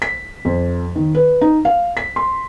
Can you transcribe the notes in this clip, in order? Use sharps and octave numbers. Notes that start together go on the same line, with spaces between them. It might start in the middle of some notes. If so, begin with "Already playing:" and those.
B6
F2
D#3
B4
D#4
F5
B6
C6